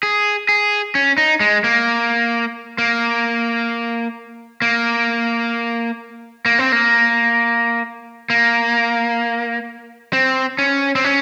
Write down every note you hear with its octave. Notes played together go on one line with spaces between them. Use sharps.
G#4
G#4
C#4
D#4
G#3
A#3
A#3
A#3
A#3
C4
A#3
A#3
C4
C#4
C4
C#4